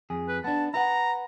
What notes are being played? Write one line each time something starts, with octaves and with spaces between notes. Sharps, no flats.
F2 G#4
B4
B3 D4 A5
E4 B4 F#5 A#5